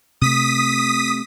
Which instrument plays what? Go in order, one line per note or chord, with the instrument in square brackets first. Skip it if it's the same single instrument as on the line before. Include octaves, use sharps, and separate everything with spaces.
[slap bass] C3 A3 [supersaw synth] D#6 B6